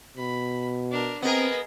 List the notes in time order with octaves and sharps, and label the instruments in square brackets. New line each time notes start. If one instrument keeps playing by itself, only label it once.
[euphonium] B2 [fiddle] B5
[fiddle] D4 A#4
[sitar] B3 A#4 [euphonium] C4 [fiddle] G#4 D#5